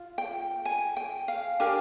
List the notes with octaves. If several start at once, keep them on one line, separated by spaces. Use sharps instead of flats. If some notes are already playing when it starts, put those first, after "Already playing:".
Already playing: F4
G5
G#5
G5
F5
D4 G4 A#4 G#5